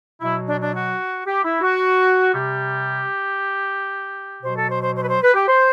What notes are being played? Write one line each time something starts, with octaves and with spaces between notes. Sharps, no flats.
B2 F#3 E4
D4
D4
F#4
G4
E4
F#4
C3 G3 G4
B2 F#3 C5
A4
C5
C5
C5
B4
C5
B4
G4
C5